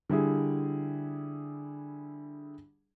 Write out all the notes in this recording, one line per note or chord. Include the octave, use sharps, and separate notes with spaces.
D3 G3 E4 G#4